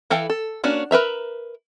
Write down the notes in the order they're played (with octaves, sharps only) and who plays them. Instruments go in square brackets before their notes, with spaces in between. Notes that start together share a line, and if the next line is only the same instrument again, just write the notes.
[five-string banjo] E3 E4 A4 F5 G5
A4
A#3 C#4 D4 F#4
A#4 B4 E5 A#5